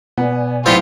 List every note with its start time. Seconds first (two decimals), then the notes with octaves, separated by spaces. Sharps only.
0.17 B2 B3 D5 G#5
0.66 B1 A2 B3 C4 F4 G4